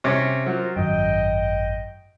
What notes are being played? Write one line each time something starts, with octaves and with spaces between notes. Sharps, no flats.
C3 C#4
F#3 F4 A#4 C5
G#1 F#2 D#5 G5